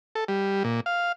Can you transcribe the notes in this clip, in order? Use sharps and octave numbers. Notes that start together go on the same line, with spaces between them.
A4
G3
A#2
F5